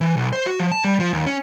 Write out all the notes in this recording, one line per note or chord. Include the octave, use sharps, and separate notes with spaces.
E3
B1
C5
F#4
F3
A5
G3
F3
D#2
C#4